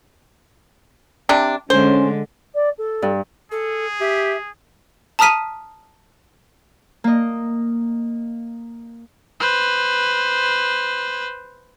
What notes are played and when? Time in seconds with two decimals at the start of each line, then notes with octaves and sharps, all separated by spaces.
1.29 C3 D4
1.70 D3 G#3 C#4 C5
2.54 D5
2.78 A4
3.02 G2
3.52 G#4 A4
4.01 G4 E5
5.19 A5 A#5 D#6 F6 B6 D#7
7.04 A#3 D#5
9.40 B4 C5